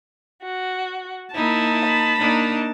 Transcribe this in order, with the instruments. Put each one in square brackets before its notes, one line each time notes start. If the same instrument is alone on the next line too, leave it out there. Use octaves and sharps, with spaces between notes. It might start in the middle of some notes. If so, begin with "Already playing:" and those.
[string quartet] F#4
[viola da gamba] A#3 D#4 [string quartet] E4 [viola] A5
[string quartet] B5
[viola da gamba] A#3 D4 D#4